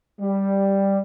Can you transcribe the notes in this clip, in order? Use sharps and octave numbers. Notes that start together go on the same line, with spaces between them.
G3